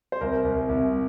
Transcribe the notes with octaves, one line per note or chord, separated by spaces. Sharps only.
C5
C2 A#4
C2
C2